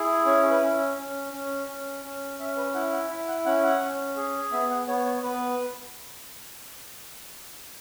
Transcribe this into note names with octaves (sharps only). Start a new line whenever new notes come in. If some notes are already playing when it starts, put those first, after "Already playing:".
Already playing: E4 G#4
C#4 C#5
B4
C#4
C#4
C#4
C#4
C#4
C#4 E5
B4
E4 F#5
F#5
E4 E5
F#5
C#4 F#5
F#5
C#4
G#4
B3 E5
F#5
B3 C#5
C#5
B3 B4